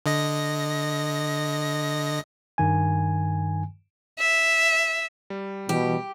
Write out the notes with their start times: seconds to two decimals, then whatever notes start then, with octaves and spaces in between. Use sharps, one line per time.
0.06 D3 D#5 A#6
2.58 G2 D#3 G#5
4.19 E5
5.30 G3
5.69 B2 E3 G4